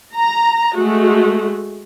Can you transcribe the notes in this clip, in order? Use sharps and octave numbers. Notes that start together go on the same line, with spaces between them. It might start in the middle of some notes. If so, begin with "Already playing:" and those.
A#5
G#3 A3 F#4